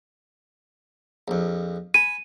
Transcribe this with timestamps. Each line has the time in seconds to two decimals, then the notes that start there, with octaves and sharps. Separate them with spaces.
1.28 A#1 F2
1.94 G#5 B5 D#7